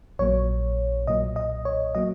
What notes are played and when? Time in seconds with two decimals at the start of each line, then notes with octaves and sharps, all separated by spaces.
0.19 A#1 A#2 F#3 A#3 C#5
1.07 B1 A#2 F#3 A#3 D#5
1.36 D#5
1.65 C#5
1.95 F#3 A#3 D#5